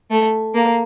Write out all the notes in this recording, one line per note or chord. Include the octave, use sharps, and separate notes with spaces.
A3
A#3